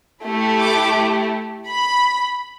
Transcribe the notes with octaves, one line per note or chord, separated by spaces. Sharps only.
A3 E4 G4
D6
B5